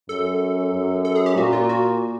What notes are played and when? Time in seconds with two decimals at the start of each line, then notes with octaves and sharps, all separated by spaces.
0.09 F#2 A4
0.73 F#2
1.05 A4
1.16 G#4
1.26 G4
1.37 A#2 F#4
1.53 F4
1.69 F#4